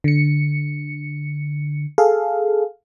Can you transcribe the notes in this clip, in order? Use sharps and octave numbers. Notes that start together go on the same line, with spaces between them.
D3 C#7
G#4 A4 F5